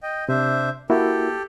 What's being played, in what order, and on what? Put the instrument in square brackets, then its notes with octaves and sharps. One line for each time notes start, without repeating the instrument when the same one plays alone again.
[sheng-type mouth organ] D#5 G5
[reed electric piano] C3 [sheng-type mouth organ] D4 C5 E5
[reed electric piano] A#3 E4 F#4 [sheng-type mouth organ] G4 A4